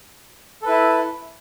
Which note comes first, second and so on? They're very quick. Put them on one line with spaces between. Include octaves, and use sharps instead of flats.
A4 B4 E4